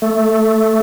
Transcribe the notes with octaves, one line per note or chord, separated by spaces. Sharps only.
A3